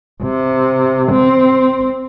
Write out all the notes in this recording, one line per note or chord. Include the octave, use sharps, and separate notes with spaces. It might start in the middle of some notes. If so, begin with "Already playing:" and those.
C3
C4